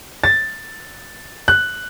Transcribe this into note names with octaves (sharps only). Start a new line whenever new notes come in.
A6
F#6